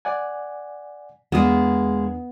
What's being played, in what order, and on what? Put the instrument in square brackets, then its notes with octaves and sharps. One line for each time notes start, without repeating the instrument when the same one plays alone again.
[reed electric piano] D5 F#5 G#5
[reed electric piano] E2 D4 D#6 [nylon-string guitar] G#3 A#3 [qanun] B3